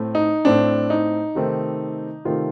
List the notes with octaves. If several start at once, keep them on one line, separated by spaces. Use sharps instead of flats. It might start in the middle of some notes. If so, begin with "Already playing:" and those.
Already playing: A2 A3 C4
D#4
A2 A3 C4 D4
D#4
C3 D#3 A3 C4
C3 D#3 A3 C4 F4